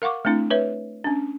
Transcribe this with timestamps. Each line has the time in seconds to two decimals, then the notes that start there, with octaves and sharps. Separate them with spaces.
0.02 A#4 F5 F#5 C#6 D6
0.25 A3 C4 D4 E4
0.51 B4 C#5 E5
1.04 C#4 D4